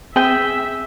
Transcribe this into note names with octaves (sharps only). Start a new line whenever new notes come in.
C4 G#4 E5 G5